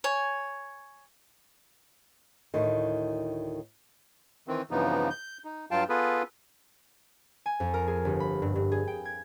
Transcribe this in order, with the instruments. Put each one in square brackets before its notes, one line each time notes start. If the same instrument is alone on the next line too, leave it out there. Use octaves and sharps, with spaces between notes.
[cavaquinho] C#5 G#5
[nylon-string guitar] D2 A2 D#3
[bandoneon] D#3 E3 C4
G2 C#3 E3 F3 B3 D#4
G6
D#4
G2 F#3 F4 F5 G5 A5
B3 F4 G#4 A4 B4
[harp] G#5
F2
A#4
G#4
G1
B5
G2
G2
G#4
G5
G#6